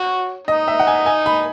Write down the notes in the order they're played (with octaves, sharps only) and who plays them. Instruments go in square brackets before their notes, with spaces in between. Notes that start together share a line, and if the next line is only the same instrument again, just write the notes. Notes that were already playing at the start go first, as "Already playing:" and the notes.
Already playing: [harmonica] F#4 [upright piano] C#5
[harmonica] D#4 [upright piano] D#5
[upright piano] E5
F#5
G#5
G#5
B5